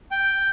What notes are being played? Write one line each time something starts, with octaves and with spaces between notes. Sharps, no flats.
G5